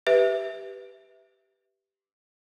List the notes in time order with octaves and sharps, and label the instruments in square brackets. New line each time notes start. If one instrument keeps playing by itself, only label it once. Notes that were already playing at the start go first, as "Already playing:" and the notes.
[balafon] G4 B4 E5